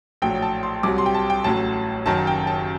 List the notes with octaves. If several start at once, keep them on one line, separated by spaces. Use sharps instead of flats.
A#1 A2 F#3 G5
A5
C6
C2 C3 F#3 D6
C6
G5
A5
G5
A1 A2 F#3 A5
F#1 F#2 D#3 F#3 A5
G5
A5